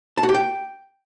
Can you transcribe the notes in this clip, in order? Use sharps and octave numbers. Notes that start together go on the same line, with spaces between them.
A5
F#4
G4
G5